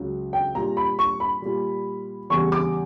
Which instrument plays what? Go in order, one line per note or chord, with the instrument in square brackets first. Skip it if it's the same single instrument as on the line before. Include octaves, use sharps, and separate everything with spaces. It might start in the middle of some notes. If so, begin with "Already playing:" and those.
Already playing: [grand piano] C#2 C#3 F#3
G5
A#2 G3 A#5
B5
C#6
B5
A#2 G3
E2 C#3 G3 C#6
D6